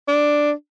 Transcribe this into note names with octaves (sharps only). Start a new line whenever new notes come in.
D4